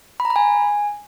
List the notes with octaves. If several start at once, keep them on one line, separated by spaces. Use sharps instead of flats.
B5
A#5
B5
G#5